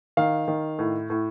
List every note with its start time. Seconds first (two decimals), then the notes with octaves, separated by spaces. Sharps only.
0.17 D#3 F5
0.48 D#3
0.79 A2
1.10 A2